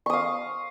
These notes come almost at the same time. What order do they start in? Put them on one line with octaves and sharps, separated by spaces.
C#6 D#6 F5